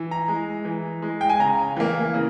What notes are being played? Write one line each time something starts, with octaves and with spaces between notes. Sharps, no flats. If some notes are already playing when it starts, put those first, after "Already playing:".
Already playing: E3
A#5
G#3
E3
G#3
G5
G#5
C#3 A#5
E3 A#3
C#3